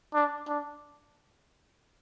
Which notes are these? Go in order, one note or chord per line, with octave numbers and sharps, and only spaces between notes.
D4
D4